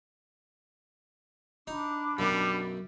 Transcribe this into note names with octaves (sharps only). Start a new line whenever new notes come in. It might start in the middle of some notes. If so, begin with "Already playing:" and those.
D4 D#4 B5 D6
B1 F#2 G3